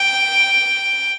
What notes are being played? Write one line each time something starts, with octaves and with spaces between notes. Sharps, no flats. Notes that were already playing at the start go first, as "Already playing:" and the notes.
Already playing: G5